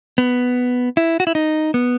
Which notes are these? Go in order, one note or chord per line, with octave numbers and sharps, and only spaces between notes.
B3
E4
F#4
E4
D#4
B3